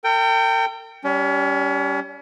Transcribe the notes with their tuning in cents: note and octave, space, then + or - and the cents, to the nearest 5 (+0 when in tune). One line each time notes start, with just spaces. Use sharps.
A#4 -45 G5 +0
G3 -5 C#4 +35